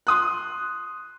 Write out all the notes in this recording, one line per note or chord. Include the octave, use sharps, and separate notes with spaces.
C6 D#6 F#6